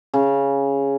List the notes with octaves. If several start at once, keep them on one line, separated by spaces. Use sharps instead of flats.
C#3